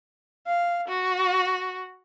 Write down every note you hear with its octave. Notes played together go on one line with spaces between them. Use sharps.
F5
F#4